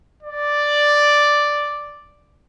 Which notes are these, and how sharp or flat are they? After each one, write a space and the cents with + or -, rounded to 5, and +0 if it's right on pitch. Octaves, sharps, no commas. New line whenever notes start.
D5 +0